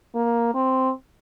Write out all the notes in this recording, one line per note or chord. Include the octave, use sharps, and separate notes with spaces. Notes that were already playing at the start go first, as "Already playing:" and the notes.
A#3
C4